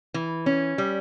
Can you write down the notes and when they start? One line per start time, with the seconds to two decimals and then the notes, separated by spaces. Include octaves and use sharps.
0.14 E3
0.46 C#4
0.78 G3